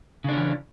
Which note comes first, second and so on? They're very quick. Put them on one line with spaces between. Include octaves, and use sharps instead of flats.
C#3 D4 C#4 E3